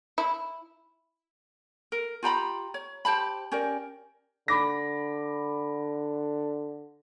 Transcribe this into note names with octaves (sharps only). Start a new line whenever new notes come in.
E4
A#4
F4 G4 A#5 B5
C#5
G4 C5 A5 B5
C#4 G4 A#4 D5
D3 B5 D6 A#6